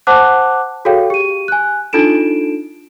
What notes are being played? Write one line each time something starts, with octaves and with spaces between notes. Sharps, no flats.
C5 F#5 A5 D6 F#6
F#4 G#4 A4 C#5 F5 G5
G4 D#7
G#5 F#6
D4 D#4 F4 A4 D7 E7